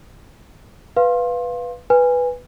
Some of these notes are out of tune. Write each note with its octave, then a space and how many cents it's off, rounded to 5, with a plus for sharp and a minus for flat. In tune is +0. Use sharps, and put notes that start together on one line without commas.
B4 +0 F5 +0 C6 +25
B4 +0 G#5 -25